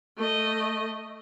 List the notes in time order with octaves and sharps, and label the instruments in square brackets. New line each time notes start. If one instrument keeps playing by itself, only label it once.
[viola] A3 D#5